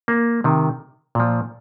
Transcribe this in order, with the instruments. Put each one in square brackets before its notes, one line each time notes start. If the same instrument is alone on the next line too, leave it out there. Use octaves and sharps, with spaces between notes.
[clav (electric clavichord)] A#3
C3 D#3
A#2 F3